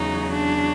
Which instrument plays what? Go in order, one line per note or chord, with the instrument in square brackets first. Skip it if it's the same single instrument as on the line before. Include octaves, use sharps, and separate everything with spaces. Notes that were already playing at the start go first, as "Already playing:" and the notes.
Already playing: [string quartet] E2 C#3 F#3 D#4
D4